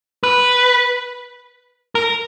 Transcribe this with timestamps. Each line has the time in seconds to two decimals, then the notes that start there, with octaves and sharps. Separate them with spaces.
0.23 B4
1.95 A#4